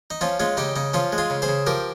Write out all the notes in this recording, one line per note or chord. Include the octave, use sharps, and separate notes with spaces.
D#4
F3 C#4 F4
G#3 C#4 F4
C#3 D#4 G4
C#3 D#4
F3 C#4 F4
G#3
F4 G#4
C#3
G#4 C5
C#3
F3 G4 A#4